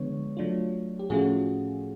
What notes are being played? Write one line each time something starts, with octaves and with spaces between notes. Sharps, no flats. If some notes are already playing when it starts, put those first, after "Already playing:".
Already playing: D3 F3 G#3 B3 D4 C#5
F#3 A3 D4 F4
G4
A2 F3 A3 C#4 F4 F#4 G#4